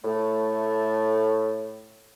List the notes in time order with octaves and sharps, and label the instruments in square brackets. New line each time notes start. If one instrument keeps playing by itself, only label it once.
[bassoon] A2 [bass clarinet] A3